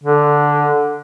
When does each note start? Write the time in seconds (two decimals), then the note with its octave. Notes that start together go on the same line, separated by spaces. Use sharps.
0.04 D3